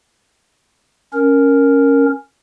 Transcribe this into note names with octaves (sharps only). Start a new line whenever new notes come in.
C#4 A#4